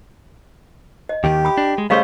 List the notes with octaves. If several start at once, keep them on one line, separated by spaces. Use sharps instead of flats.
D#5
D#2 D#3 G4
B5 D#6
D4
G#3
C#3 G3 A3 C5 D#5 F5 C#6